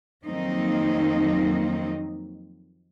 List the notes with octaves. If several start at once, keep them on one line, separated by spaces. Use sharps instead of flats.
F2 D#3 F#3 A#3 C4 D#4